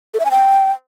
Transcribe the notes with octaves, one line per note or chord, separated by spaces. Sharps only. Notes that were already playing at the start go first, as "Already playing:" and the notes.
A4
E5
G#5
G5